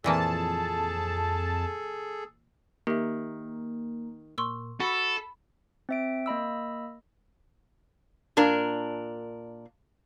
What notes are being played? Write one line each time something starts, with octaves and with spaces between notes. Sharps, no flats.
F2 A#2 E3 A#3 G#4 A4 A5
D#3 A#3 G4 E5
A#2 C6 C#6 E6
F#4 A4 B5
C4 E5 D7
A#3 D#5 B5 E6
A#2 D4 A#4